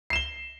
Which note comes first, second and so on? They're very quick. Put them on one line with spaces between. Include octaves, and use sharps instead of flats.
C7 E7 G7